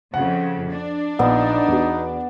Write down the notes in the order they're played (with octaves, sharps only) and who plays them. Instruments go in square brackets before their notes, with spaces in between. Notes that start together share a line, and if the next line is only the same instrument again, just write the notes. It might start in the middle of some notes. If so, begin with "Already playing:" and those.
[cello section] F2 C#3 [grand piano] F#5
[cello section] D4
[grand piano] A#1 [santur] B3 [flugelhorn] D#4
[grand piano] E2 F#4